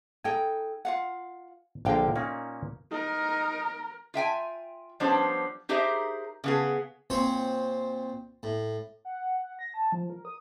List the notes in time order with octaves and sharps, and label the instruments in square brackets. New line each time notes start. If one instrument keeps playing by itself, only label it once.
[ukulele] D#4 A4 G5 [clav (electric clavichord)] G#5
[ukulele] F4 F5 F#5
[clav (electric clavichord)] A#1 D3 A#4 [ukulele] D4 F5 G5
[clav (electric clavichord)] A#2 A#3 C#4 [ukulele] D#4
[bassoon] D#4 [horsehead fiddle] A#4
[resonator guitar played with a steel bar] F4 E5 G5 G#5
F3 G3 B3 C#4 D4 C5
D#4 G4 G#4 A#4 C5 E5
C#3 B3 G#4
[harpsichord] A#2 C4 C5 C#5
A2
[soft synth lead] F#5
F#5
A#6
A5
F3
A#4
D#6